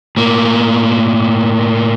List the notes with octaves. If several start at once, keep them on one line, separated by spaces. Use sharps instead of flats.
A2 A#3